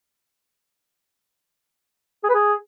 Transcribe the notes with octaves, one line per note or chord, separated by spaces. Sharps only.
G#4
B4
G#4